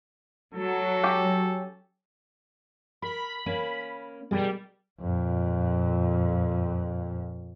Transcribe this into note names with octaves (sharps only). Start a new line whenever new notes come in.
F#3 A4
C#4 G4
A#4 B5
A#3 C#4
B2 G3 G#4 A#4
F2 A#2